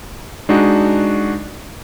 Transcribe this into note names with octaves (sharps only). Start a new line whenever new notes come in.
G#3 D4 D#4 F#4